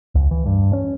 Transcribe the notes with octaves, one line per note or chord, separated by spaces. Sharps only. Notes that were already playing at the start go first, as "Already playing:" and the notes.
C#2
E3
G2
C#4